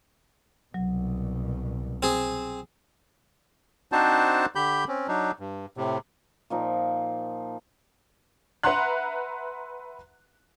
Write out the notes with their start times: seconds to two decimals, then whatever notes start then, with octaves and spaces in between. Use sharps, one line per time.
0.74 C2 B2 F#3
2.03 C4 G#4
3.92 C4 D4 D#4 F#4 C5 A5
4.55 D3 G4 B5 G6
4.88 C4 C#4
5.08 F#3 D4 D#4
5.39 G2
5.77 A2 C3
6.50 A#2 F3 D#4
8.63 B4 E5 F#5 A#5 C6 F#6